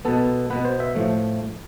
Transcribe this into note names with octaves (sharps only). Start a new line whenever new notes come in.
B2 B3 A4
B2 B3 B4
C5
E5
A2 F3 A3